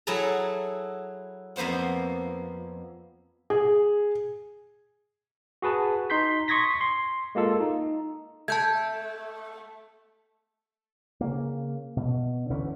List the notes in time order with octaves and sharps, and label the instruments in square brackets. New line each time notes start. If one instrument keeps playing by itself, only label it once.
[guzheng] F#3 E4 G#4 A4 A#5
F2 A#3 B3 C5 F#5
[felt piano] G#4
[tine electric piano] F#4 G#4 B4 A5
D#4 C6 G6 B6
C6 C#6 D#6 G#6 A#6 B6
C6
G#3 A#3 F4 A4
D#4
[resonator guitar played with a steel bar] A3 [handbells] A5 G6 G#6
[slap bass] C#3 A#3
B2
D2 D3 E3 C#4